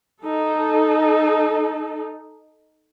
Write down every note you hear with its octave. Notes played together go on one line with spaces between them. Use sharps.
D#4 A4